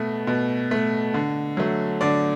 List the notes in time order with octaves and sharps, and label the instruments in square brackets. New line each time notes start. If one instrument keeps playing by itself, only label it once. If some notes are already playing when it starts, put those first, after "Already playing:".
Already playing: [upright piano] B2 A3
B2
A3
D3
F#3 A3
D3 D5